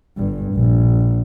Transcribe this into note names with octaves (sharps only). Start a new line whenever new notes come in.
G1 G2
A#1